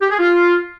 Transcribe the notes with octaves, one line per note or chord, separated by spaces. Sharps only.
G4
G#4
F4